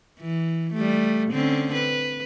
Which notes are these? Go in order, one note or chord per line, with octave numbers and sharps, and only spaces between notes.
E3
G3 A3
D3 C4 C#4
B4